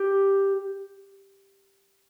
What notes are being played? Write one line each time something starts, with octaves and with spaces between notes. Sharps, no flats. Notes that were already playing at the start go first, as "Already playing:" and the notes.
Already playing: G4